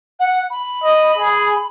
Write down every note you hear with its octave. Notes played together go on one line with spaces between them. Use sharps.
F#5
B5
D#5
G#4